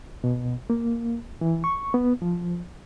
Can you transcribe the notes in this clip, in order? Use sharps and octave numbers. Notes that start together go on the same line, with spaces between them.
B2
A#3
E3
C#6
B3
F3